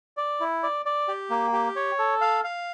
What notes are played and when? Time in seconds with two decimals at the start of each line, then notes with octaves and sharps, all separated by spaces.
0.17 D5
0.40 E4
0.63 D5
0.86 D5
1.08 G4
1.30 A#3
1.53 G4
1.76 C#5
1.99 A4
2.21 F5
2.44 F5